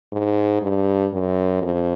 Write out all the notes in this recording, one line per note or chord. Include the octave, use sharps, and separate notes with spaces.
G#2
G2
F#2
F2